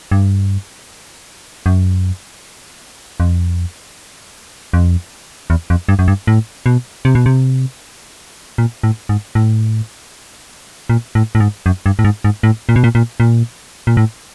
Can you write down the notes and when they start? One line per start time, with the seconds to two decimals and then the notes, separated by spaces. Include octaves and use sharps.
0.11 G2
1.66 F#2
3.20 F2
4.73 F2
5.50 E2
5.70 F2
5.89 G2
5.99 F#2
6.08 G2
6.27 A2
6.66 B2
7.05 C3
7.15 B2
7.26 C3
8.58 A#2
8.83 A2
9.09 G#2
9.35 A2
10.90 A#2
11.15 A2
11.35 A2
11.40 G#2
11.66 F#2
11.86 G2
11.99 A2
12.04 G#2
12.24 G#2
12.43 A2
12.69 A#2
12.76 B2
12.84 A#2
12.95 A#2
13.20 A#2
13.87 A#2
13.97 A2